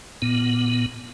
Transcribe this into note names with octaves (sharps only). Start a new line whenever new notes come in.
A#2 B3